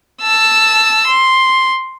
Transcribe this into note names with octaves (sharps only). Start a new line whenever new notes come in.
A5 E6
C6